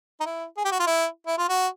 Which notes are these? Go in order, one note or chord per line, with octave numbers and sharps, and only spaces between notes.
D#4
E4
G#4
G4
F#4
F4
E4
E4
F4
F#4